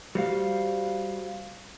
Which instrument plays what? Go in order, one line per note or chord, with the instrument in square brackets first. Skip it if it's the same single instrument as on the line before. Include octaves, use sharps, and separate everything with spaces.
[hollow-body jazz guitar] G3 [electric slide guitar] F#4 C5 F5